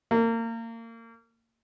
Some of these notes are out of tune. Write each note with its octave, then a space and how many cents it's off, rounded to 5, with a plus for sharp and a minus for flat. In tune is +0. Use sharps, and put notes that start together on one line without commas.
A#3 -30